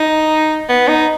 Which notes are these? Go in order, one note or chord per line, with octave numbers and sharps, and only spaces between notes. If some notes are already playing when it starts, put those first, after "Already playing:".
Already playing: D#4
B3
D#4